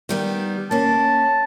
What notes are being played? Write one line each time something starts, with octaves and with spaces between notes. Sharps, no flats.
D#3 G3 B3
A#3 C#4 A5